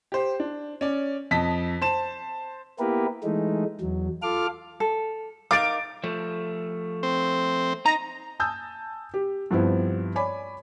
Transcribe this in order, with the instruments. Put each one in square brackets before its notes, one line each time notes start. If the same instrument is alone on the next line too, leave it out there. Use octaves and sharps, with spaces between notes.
[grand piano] G4 C5
D4
C#4 D5
F2 D#5 A5 B6
C5 A5 E7
[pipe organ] A#3 B3 E4 G4 A#4 B4
E3 G#3 A3 D#4
E2 F#3
F4 A4 F5 D6 F6
[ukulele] A4
[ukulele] D#4 A#4 F5 [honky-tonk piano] D6 A6 D7
[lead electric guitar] F3 A3
[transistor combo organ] C4
[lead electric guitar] D#4 [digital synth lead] A#5
[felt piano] G#5 A5 D#6 E6 G6
G4
G2 F3 B3 C4 E4
C#5 D5 G#5 B5 D6